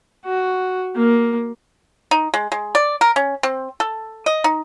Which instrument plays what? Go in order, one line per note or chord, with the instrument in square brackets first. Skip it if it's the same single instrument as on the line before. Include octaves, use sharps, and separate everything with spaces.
[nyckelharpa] F#4
A#3
[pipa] D#4
G#3
G#3
D5
A#4
C#4
C4
A4
D#5
D#4